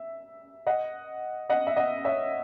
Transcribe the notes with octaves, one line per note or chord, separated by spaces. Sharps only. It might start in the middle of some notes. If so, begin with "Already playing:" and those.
Already playing: E5
D#5 F#5
D#5 F#5
E5
D#5 F#5
C#5 E5